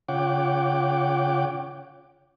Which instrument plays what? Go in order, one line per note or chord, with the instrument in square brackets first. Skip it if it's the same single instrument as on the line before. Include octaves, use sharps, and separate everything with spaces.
[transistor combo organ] C#3 F4 C#5 F#5 G5 D6